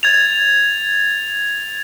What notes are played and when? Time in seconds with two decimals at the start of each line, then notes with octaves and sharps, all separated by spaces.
0.03 G#6 A6 F7